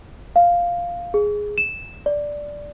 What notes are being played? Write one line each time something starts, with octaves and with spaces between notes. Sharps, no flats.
F5
G#4
E7
D5